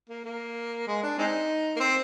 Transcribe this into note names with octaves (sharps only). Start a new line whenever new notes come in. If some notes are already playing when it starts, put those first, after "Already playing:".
A#3
A#3
G#3
D4
G#3 C4 D#4
A#3
C4